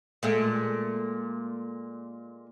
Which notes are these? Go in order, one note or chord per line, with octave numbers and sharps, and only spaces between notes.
A#2 G#3 A3